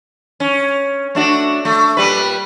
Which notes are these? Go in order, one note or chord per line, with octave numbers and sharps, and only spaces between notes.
C#4
A3 D4 F#4
A3
A#2 G3 B4